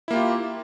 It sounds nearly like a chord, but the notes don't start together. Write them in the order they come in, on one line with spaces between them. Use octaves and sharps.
E4 A#3 G4 F4